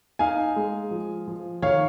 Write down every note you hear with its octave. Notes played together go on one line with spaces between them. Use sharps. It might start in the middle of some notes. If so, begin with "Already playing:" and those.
D#4 F5 G#5
G#3
F3
F3
D#3 C#5 F5